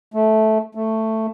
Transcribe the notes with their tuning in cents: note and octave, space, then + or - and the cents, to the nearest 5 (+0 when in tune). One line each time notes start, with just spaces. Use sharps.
A3 -10
A3 +10